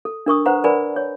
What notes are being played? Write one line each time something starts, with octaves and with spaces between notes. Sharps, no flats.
A4
D4 A#4 C#6 D#6
B4 C5 F#5 A#5
A#4 B4 D5 G#5 B5
C#5